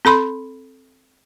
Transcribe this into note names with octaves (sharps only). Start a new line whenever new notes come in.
C4 A4 B5 C6